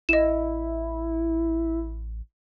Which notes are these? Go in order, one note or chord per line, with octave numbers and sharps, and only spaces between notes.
A1 E4 D#5 E7